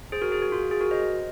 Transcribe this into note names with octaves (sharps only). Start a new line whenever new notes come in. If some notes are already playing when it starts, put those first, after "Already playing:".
G#4 C5
F#4 A#4
G#4
F#4
F4
G#4
F#4 A#4
C5 D#5